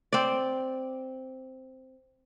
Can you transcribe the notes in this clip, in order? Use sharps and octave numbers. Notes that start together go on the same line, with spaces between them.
C4 D5